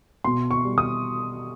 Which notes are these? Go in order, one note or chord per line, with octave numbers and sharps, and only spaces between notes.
B2 C6
C#6
G3
D#6